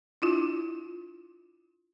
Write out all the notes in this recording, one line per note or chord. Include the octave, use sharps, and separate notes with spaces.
D4 E4 F4